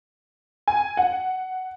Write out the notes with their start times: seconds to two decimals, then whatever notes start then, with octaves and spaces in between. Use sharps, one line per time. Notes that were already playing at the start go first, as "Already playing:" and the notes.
0.68 G#5
0.97 F#5